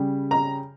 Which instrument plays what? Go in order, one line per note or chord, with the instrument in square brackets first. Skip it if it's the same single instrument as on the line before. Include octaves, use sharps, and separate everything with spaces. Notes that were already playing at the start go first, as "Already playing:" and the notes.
Already playing: [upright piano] C#3 G3
A#5